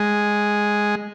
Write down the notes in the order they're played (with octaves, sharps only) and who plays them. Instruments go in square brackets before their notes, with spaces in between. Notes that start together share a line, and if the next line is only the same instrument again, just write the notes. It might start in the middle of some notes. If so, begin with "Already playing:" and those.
Already playing: [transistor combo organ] G#3